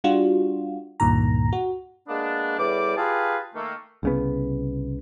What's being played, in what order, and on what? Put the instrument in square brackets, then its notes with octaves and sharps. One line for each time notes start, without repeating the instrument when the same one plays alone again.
[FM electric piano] G3 D4 F4 F#4
C#2 G2 A#2 D#3 A#5
F#4
[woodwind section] G#3 A#3 B3 D4
E2 A2 G3 D5 D6
F4 G4 G#4 B4 F5 A5
D#3 A3 A#3
[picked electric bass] C2 C#3 B3